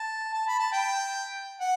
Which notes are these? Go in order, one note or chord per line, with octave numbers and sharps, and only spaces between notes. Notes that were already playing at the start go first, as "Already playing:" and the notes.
Already playing: A5
A5
B5
A5
G5
F#5